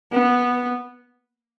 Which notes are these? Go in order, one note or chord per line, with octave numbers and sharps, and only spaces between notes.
B3